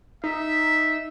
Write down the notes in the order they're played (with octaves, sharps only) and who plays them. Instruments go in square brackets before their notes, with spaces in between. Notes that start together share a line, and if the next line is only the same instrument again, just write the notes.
[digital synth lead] D#4 [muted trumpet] E5